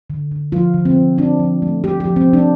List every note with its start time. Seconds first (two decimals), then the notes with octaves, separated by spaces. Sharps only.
0.10 D3
0.31 D3
0.52 F3 F4
0.74 D3
0.85 C4
0.97 F3
1.18 C4 D4
1.40 F3
1.62 A3
1.84 A3 G4
2.00 G4
2.06 F3
2.16 C4
2.28 F3
2.33 D4